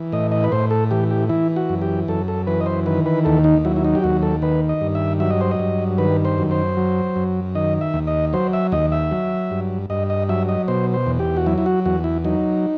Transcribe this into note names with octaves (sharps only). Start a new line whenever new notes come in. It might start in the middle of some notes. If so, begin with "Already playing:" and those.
Already playing: E3
A2 D#5
D#5
B4
A2 C5
A4
E3 G4
G4
E3 E4
F#4
F#2
G4
F#2 A4
A4
E3 B4
D#5
C5
D#3 B4
B4
D#2 A4
D#4
F#3 E4
E4
D#4
G4
D#2 F#4
A4
D#3 B4
D#5
G2
E5
F#3 E5
D#5
C5
D#5
G2
D#3 B4
C5
F#2
C5
F#3
F#2
D#3 D#5
E5
D#2
D#5
F#3 C5
E5
D#2 D#5
E5
F#3
G2
G2 D#5
D#5
F#3 E5
D#5
B2 C5
C5
E2
G4
F#4
F#3 E4
E4
F#4
E2 F#4
E4
F#3 D#4